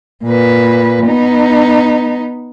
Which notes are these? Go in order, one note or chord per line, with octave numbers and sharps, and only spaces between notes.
A#2 B4
B3 D#4